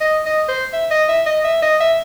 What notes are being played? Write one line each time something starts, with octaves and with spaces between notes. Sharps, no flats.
D#5
D#5
C5
E5
D#5
E5
D#5
E5
D#5
E5